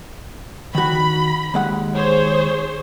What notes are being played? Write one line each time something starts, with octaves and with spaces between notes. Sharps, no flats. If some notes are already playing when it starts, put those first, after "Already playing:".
D#3 F#4 B5
D#2 G#3 F#5
G#4 C5 C#5